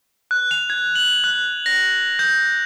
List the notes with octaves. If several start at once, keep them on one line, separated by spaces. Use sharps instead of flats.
F#6
F7
G#6
F#7
F#6
A#6
G6